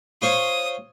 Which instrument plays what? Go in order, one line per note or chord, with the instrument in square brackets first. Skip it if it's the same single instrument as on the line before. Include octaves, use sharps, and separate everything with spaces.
[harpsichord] F4 C5 C#5 [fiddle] D#6